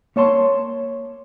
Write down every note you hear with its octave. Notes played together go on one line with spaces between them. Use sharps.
A#3 C#5 A5 C6